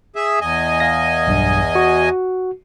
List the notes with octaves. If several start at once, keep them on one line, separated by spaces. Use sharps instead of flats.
G#4 E5
E2 D#5 G#5
F5 A#6
B1 G2
F#4